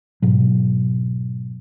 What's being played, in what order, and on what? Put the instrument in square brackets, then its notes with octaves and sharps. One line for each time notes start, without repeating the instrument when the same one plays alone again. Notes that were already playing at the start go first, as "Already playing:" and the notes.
[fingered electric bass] G#2 B2 F#3